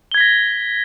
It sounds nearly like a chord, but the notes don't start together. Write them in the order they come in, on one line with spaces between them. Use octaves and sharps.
G7 G#6 B6 A#6